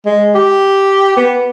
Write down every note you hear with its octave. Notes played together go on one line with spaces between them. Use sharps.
G#3
G4
B3